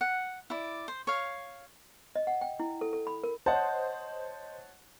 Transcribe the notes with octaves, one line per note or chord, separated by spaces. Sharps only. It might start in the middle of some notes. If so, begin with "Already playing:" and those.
F#5
E4 D5
C5
C#5 F5
D#5
F#5
G5
E4
A4
A4
B5
A#4
C5 C#5 D#5 F#5 A5